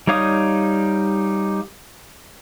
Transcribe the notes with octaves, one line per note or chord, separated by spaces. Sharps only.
G3 D#4 C#5 F5 D#6